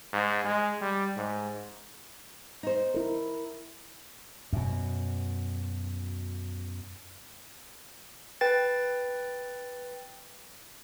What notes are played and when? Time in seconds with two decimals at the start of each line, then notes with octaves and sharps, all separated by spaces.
0.13 G#2
0.44 G#3
0.81 G3
1.17 G#2
2.63 D#4 C5
2.94 E4 A#4
4.53 F#2 B2
8.41 B4 G5 A6